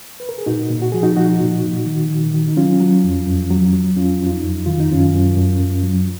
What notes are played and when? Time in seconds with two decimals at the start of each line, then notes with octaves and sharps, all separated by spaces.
0.20 B4
0.29 A#4
0.38 G#4
0.46 A#2 D#4 F#4
0.70 A#2
0.82 F#4
0.92 F3 G#4
1.03 D#4 F#4
1.17 F3 D#4 F#4
1.41 A#2
1.63 A#2
1.86 D#3
2.10 D#3
2.33 D#3
2.48 D#4
2.57 F#3 C#4 F4
2.80 F#3
3.04 F2
3.27 F2
3.51 F#3
3.73 F#3
3.96 F2 C#4 F4
4.20 F2
4.27 F4
4.32 D#4
4.43 F2
4.66 D#3 F4
4.80 D#4
4.90 F#2 C#4 F4
5.14 F#2
5.36 F#2
5.60 F#2
5.83 F#3